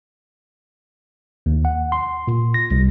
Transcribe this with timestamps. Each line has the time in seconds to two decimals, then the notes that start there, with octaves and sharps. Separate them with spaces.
1.46 D#2
1.65 F#5
1.92 C6
2.28 A#2
2.54 A#6
2.71 C2